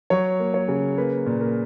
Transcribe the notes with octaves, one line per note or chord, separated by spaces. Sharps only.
F#3 C#5
A#3
C#5
C#3
A#3 B4
A#2
A#4